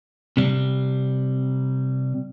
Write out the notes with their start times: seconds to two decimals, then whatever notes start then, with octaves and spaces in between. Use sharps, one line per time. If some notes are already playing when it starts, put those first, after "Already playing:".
0.37 C3 G3